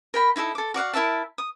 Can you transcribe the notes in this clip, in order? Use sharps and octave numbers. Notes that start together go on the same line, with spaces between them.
A#4 G5 B5
D#4 E4 G#4 A4
A4 D6
F#4 D5 F5 F#5
E4 A#4 E5 A5
D#6